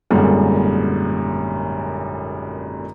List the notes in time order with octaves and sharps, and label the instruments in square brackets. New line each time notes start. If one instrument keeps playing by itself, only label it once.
[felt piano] G#1 F#2 A#2 D3 G3 G#3